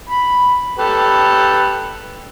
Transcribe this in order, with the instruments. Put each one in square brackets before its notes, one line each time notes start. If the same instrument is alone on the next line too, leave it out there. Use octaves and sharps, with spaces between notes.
[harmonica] B5
G4 A4 B4